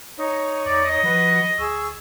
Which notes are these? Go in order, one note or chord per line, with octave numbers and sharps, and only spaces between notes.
D#4 C#5 C#6
E2 D5
D#5
F3 F#4 B4
D2 G#4 C#6 E6